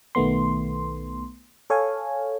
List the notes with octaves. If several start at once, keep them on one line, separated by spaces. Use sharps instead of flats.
B1 D#3 A3 B3 C6
A4 C#5 F5 G#5